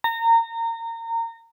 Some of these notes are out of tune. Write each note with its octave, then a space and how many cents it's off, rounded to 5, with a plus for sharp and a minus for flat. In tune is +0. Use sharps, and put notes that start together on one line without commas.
A#5 -25